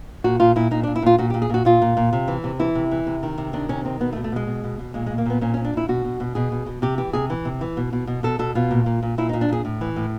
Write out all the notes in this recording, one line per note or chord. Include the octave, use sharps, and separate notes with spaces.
A#2 F#4
A#2 F4
A#2 E4
A#2 D#4
D4
A#2
E4
A#2 F4
A#2 F#4
G4
A#2
G#4
A#2 F#4
A#2 F4
A#2
A#2
C3
E3
C3
E3 E4
C3
E3
C3
D#3
C3
D#3 D4
C3 C#4
D#3 C4
B2 B3
A3
B2
A3
B2 G#3
B2
B2
B2
A#2 G#3
G#3
A#2
A#3
A#2 B3
A#2 C#4
A#2 C#4
D4
A#2 E4
B2 F#4
B2
B2
B2 G#4
B2
B2
C3 G4
E3 G4
C3 G#4
E3
C3
E3
B2
B2
B2
B2 A4
B2 A4
B2 F4
A#2
A#2
A#2
A#2 E4
D#4
A#2
D4
A#2 G#4
A2
E3
A2